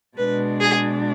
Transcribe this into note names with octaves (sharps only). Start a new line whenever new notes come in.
B2 G#3 D4 B4
G#4